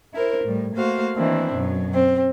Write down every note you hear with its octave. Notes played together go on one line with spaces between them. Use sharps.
E4 A#4 C5
A2 G3
A3 A#3 F#4 C5 F5
D#3 E3 A#3 C4 D4 E4
F#2 B2 F#3
C4